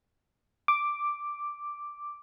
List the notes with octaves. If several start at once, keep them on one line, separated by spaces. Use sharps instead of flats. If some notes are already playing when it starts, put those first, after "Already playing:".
D6